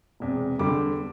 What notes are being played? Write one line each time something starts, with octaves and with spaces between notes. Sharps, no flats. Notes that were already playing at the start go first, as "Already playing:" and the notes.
E1 E2 C3
E2 D3 G3 D6